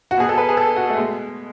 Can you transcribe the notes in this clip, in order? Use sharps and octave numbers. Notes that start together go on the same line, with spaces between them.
F#4
B2 G#4
A4
B4
G#4
A4
F#4
A3
B2 G#3